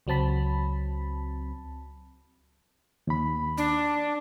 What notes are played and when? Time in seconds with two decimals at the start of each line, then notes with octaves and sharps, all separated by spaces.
0.07 C#2 F#3 C4 A5 B5
3.07 D#2 B5
3.58 D4